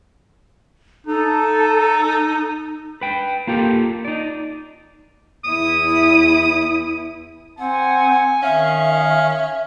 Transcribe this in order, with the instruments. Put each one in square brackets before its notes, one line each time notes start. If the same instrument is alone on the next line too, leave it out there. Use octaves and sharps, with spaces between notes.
[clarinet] D#4 [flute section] A4
[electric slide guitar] B4 G5
A#3 F4 G4 A4
D#4 D5
[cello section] E2 E4 [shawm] D#6
[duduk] C4 [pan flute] F#5 [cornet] G#5
[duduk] D#3 [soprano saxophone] C#4 [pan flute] E5 [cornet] F5